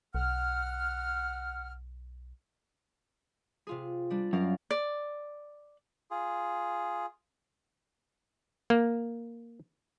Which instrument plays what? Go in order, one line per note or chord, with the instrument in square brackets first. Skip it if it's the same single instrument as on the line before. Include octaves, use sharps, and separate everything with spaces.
[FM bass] B1 [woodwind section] F#5 F6
[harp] C3 F4 G#4
G3 D4
[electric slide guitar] F#2 [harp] A#4 D5 F5
[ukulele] D5
[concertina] F4 G#4
[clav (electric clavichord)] A#3